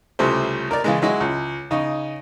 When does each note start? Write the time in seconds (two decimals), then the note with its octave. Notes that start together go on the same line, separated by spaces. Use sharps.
0.19 C#2 C3 G3 A3 E4 C5
0.71 A#4 D5
0.84 C#3 E3 G#3
1.02 F#3 G#3 E4 F#4
1.20 C#2
1.71 C#3 D#4